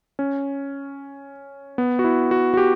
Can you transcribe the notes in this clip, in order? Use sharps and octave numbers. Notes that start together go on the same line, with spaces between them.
C#4
B3
F#4
E4
F#4
F#4
G4